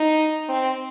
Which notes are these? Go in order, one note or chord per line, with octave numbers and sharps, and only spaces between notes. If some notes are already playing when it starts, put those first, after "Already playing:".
Already playing: D#4
C4